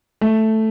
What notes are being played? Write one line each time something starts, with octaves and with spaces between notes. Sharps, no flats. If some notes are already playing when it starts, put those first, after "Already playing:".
A3